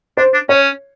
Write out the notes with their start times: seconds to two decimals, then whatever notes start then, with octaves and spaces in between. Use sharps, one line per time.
0.17 D4 C5
0.34 D4
0.49 C#4 C#5